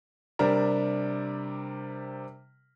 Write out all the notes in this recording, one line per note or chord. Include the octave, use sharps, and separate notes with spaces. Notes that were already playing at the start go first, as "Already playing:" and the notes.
C3 G3 D4 A#4